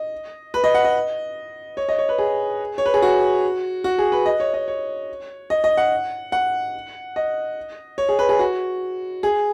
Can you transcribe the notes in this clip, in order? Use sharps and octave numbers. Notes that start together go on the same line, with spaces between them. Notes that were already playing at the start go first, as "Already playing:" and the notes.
Already playing: D#5
B4
D#5
F#5
D#5
C#5
D#5
C#5
B4
G#4
C#5
B4
G#4
F#4
F#4
G#4
B4
D#5
C#5
D#5
C#5
D#5
D#5
F#5
F#5
D#5
C#5
G#4
B4
G#4
F#4
G#4